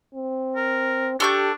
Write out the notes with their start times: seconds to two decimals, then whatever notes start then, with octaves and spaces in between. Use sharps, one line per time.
0.15 C4
0.56 A#4
1.20 D4 G4 A4 C#6 G6